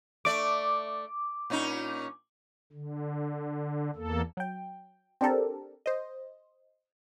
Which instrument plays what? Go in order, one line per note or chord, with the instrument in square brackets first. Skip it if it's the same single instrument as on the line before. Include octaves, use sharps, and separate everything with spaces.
[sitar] A3 D5 [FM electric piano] D6
[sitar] A#2 C#4 D#4
[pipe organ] D3
E2 A#3 A4
[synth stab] F#3 G5
C4 D4 G4 A4 A#4
C5 D#5